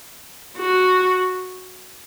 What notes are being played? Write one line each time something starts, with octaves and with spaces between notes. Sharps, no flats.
F#4